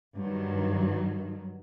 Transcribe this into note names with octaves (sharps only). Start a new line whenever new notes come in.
G2 D#3 F#3